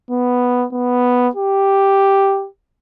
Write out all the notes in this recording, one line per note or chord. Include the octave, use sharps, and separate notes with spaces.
B3
B3
G4